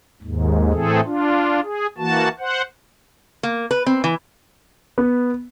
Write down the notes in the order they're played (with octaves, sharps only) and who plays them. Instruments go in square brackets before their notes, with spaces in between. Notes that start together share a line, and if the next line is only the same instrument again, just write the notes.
[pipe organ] D#2 G#2
A2 E3 A3 C4 G#4 A4
D4 F4
G#4
E3 A#3 F#4 A5
C5 F#5
[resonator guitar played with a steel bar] A#3
B4
C4
E3
[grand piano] B3